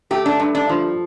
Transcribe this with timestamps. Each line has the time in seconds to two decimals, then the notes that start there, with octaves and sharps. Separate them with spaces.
0.11 A3 G4
0.26 D4
0.40 G2
0.55 D4
0.69 F3